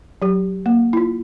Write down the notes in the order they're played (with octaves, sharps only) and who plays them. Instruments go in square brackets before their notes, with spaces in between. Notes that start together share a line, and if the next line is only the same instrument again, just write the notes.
[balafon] F#3 G4
A#3
E4 F4